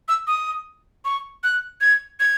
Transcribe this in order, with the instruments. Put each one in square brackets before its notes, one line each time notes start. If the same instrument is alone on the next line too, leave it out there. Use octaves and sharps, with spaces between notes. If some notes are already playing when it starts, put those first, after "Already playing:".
[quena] E6
D#6
C#6
F#6
G#6
G#6